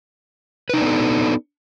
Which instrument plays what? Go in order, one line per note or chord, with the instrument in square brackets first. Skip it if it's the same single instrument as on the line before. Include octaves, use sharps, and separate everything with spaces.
[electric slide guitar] B4
D#4
D4
B3
A4